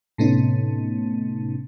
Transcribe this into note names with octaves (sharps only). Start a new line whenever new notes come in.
A2 C3 A3 B3 C#4 D#4